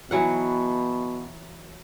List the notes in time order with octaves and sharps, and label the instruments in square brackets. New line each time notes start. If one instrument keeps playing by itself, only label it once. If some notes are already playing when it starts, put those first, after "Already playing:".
[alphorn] B2 [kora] E3 F#3 F#5